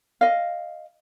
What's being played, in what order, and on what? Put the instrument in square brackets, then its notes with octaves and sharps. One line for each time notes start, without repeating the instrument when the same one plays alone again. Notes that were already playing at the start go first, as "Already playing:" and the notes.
[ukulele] D#5 F5